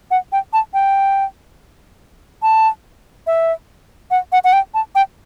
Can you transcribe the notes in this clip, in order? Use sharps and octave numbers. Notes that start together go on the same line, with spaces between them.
F#5
G5
A5
G5
A5
E5
F#5
F#5
F#5
G5
A5
G5